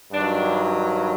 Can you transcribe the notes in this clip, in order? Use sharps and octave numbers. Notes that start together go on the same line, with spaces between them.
G2 D#3 F#3 D4